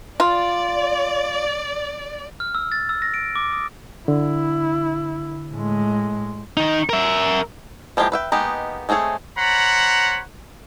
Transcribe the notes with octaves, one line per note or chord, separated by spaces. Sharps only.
F4 D5
F6
E6
A6
E6
A#6
D7
D6
D#6
D3 E4
A2 G#3
D#3 D#4
A#4 E5
E3 F3 G#3 A#3 G4
B4 E5 G5
G#3 A#3 B3 D#4 G4
G#3 A3 C4 G#4 C#5
C5 C#5 F#5 A#5 B5